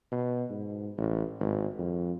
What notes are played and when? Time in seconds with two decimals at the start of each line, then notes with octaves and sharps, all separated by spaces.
0.12 B2
0.50 G#2
0.97 A1
1.40 G#1
1.78 F2